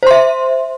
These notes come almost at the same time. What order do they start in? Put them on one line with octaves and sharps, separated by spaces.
C5 C6 E5